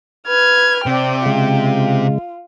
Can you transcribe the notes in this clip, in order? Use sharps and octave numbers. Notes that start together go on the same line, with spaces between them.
B4 F6 G#6
C3 C4 D5 G5
C#3 G#3 F4